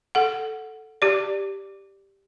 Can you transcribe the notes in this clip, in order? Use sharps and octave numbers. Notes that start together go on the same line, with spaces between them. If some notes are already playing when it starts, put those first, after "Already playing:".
A4 F#5
G4 D5